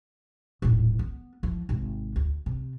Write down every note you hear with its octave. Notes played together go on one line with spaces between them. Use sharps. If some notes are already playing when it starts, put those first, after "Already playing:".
D#1 A2
B3
E2 F3
G#1 C3
D2
C3